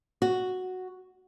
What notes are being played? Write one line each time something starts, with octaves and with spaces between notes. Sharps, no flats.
F#4